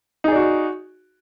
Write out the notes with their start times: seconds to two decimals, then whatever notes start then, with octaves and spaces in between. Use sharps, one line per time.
0.24 D#4
0.28 G#4
0.32 D5
0.36 F#4